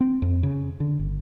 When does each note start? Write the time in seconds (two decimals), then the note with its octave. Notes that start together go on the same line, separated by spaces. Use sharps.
0.01 C4
0.22 F2
0.43 C#3
0.80 D3
0.99 G1